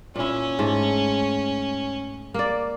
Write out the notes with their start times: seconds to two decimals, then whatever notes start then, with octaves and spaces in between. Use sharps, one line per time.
0.16 A#2 C#4 E4
0.59 G#2 A3
2.34 A#3 D5